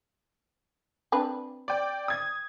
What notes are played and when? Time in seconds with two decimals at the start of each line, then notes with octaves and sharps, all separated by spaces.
1.12 C4 D4 B4
1.68 D5 G5
2.08 D#6 G#6